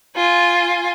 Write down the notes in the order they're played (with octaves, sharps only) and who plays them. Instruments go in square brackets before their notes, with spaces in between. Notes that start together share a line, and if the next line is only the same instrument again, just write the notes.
[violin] F4 G#5